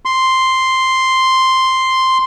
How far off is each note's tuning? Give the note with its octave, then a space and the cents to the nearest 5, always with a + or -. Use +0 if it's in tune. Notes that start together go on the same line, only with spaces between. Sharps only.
C6 +0